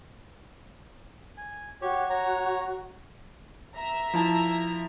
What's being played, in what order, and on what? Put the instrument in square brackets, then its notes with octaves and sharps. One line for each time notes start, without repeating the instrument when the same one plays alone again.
[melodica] G#5
[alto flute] F#4 [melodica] G4 C#5
[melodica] C#5 A#5
[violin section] E5 A#5
[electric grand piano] F3 E4 A5